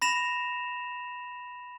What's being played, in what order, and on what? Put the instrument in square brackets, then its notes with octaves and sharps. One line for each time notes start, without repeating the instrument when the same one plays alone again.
[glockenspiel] B5 A#6 E7 F7